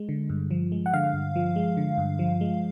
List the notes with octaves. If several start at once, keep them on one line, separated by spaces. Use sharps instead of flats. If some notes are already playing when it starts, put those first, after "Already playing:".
Already playing: G#3
D3
G2
F3
G#3
F#5
D3 F5
G2
F3
G#3
D3
G2
F3
G#3